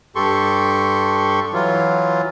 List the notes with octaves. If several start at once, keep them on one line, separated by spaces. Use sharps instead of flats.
G2 G4 A4 C6 C#6
E3 F#3 F4